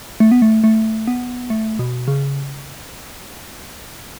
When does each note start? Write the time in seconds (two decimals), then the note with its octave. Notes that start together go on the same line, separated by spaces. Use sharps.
0.20 A3
0.32 B3
0.42 A3
0.64 A3
1.07 B3
1.50 A3
1.79 B2
2.08 C#3